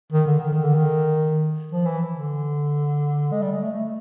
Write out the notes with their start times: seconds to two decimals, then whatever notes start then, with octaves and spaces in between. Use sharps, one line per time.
0.13 D#3
0.27 D3
0.40 D#3
0.53 D#3
0.65 D3
0.76 D#3
1.72 F3
1.86 E3
2.13 D3
3.32 G#3
3.42 G3
3.52 G#3
3.63 A3
3.73 A3